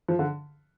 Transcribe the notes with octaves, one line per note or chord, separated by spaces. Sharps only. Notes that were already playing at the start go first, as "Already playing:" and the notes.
F3
D3